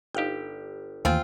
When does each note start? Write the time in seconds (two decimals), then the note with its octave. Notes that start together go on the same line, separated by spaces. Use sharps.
0.15 G1 D#4 G4 F5 G5
1.05 D#2 D#3 E3 A3 A#3 C4 F4 G#5